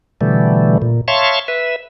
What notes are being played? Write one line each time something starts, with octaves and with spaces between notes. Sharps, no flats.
B2 D3 E3 G3 A3
A#2
C#5 E5 F5 A5 C6 C#6
B4 E5